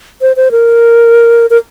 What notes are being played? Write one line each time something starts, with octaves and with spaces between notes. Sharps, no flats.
C5
C5
A#4
A#4